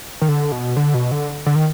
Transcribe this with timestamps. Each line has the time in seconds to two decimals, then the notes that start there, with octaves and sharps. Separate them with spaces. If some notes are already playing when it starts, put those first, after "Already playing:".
0.22 D#3
0.28 D3
0.52 B2
0.76 D3
0.94 B2
1.11 D3
1.46 D3
1.55 D#3